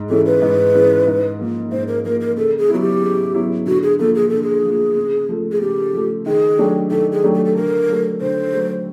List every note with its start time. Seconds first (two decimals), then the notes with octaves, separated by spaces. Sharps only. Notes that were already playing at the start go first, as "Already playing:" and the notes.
Already playing: G#2
0.09 E3 G#3 C#4 E4 A4
0.26 B4
0.42 G#2
0.75 E3 G#3 C#4 E4
1.07 G#2
1.39 F3 A#3
1.72 G#2 C5
1.88 A#4
2.05 F3 A#3 A#4
2.21 A#4
2.36 C#3 A4
2.58 G#4
2.69 F#3 B3 E4 F#4
2.80 G4
3.02 C#3
3.34 F#3 B3 E4
3.66 D3 F#4
3.83 G#4
3.99 F3 A#3 A4
4.15 G#4
4.29 D3 A4
4.43 G#4
4.64 F3 A#3
4.96 C#3
5.29 F3 A3
5.52 G#4
5.61 C#3 G4
5.93 F3 A3
6.26 D#3 G#4
6.58 F#3 A3 D4 G4
6.91 D#3 A4
7.12 G#4
7.23 F#3 A3 D4 G4
7.34 A4
7.45 A4
7.56 D3 A#4
7.89 F#3 A3
8.21 D3 C5
8.53 F#3 A3